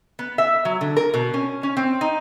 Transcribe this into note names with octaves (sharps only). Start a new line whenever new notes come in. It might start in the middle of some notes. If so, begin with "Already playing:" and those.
B3
E5
F#3
D3
A#4
B2
C#4
C#4
C4
D#4